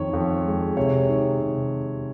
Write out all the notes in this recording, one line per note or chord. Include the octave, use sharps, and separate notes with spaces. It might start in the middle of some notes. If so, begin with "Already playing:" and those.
Already playing: F2 D#3 C#5
F2
G#3
C3 C#5
D#3
C3